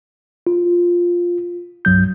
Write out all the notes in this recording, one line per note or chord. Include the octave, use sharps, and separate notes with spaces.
F4
C2 G2 F#3 G6